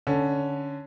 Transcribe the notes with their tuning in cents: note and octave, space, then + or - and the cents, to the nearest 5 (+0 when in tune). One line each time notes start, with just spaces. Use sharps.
D3 +0 C#4 +10